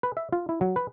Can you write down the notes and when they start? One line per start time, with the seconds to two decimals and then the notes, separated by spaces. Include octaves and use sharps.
0.03 B4
0.17 E5
0.32 F4
0.49 E4
0.61 F#3
0.76 B4